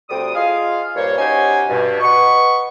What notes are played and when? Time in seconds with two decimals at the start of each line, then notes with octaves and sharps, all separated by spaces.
0.09 D2 G3 C4 D#6
0.35 F4 G#4 D#5 F5
0.96 G2 A#2 A#3 C5 C#5
1.18 C#4 D#4 F#4 G4 C5 G#5
1.68 G2 B2
2.00 B4 D#5 F#5 C#6